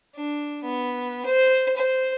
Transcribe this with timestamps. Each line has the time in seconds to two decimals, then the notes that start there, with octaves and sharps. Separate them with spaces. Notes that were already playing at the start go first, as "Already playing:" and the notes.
0.15 D4
0.64 B3
1.25 C5
1.76 C5